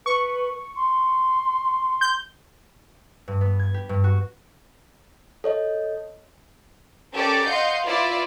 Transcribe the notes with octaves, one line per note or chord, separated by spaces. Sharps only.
B4 C#6
C6
G6
G2
B3
G#6
G4
G2
F#4
A4 C#5 D#5
C#4 G4 A4 A#4 D5
D#5 F5 F#5 C6 G6
E4 F4 B4 D5 E5